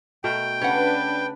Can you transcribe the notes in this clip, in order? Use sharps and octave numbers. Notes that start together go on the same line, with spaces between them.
B2 A3 A#4 G5
C#3 D4 B4 C#5 F#5